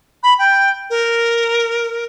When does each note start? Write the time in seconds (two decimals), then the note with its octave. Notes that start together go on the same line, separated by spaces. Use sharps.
0.23 B5
0.39 G5
0.90 A#4